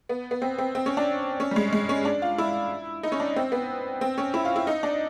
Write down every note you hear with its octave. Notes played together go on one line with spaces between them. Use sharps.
B3
B3
C4
C4
C4
C#4
D4
C#4
G3
G#3
G#3
C#4
D4
F4
E4
D#4
C#4
D4
C4
B3
C4
C#4
E4
F4
E4
D#4
D4